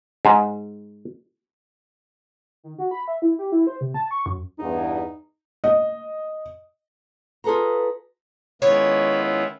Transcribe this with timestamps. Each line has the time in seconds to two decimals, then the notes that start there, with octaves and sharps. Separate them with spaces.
0.25 G#2
2.64 D#3
2.78 F#4
2.91 B5
3.08 E5
3.22 E4
3.39 G4
3.52 E4
3.67 C5
3.81 C3
3.94 A5
4.11 C#6
4.26 F#2
4.59 E2 G2 D#4
5.64 D#5
7.44 F4 G#4 A4 B4 A#5
8.62 D#3 G#3 B3 C#4 E4 F4 C#5